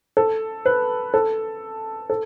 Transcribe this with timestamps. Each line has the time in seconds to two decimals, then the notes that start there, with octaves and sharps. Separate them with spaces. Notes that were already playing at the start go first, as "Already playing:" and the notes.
0.17 A4
0.66 B4
1.14 A4
2.10 A4